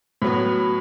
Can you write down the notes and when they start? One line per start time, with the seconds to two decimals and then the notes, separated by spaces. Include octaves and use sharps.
0.22 A2 F#3 B3